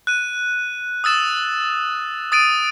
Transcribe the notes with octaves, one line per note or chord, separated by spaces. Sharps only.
F#6 D#7
D#6 E6 A6 E7
D#6 A6 D7 D#7